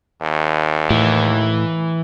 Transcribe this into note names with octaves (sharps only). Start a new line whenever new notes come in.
D#2
A2 E3